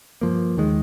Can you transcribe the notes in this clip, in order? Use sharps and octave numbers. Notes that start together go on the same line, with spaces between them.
G2 F3 A#3
D#2 D#3 G#3